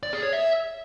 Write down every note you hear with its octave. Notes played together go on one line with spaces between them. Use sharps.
D5
G#4
C#5
E5